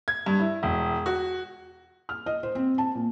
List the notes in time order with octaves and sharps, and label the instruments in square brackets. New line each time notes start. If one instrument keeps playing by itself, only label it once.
[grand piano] G#6
G2
E4
E1
F#4
[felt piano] F6
D#5
C5
C4
A5
A#2